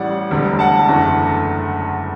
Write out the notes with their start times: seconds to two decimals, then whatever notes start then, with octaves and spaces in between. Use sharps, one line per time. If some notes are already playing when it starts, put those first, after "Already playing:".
Already playing: A1 A2 G3 D5 F#5
0.31 E1 D2 D3 G3
0.59 F#5 A5
0.88 F#1 E2 D3 A3